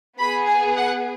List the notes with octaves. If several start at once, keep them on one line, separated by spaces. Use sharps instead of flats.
B3 G#4 B5
G#5
F#5